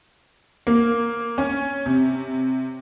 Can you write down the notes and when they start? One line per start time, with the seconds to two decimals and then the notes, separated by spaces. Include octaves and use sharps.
0.67 A#3
1.38 C#4
1.86 C3